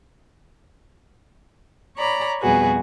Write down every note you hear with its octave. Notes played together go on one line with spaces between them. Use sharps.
C#5 D5 A#5 B5
F2 B2 G3 F#4 G#4 B4